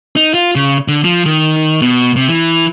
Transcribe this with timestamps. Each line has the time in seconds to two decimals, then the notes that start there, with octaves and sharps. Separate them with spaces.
0.16 D#4
0.34 F4
0.56 C#3
0.88 D3
1.04 F3
1.26 D#3
1.82 B2
2.16 C3
2.29 E3